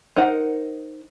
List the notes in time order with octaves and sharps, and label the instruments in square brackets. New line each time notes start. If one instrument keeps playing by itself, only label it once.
[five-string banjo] D#4 A#4 C5 F#5